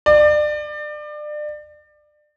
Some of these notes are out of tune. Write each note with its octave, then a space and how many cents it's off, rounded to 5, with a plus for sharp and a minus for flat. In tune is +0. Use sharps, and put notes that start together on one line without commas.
D5 +30